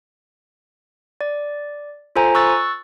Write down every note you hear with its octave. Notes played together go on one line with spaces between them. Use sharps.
D5
F4 A4 C5 G#5 A#5
C#6 E6 F#6 A6